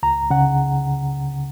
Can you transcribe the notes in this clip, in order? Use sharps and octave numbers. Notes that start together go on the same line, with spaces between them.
C#2 A#5
C#3 F#5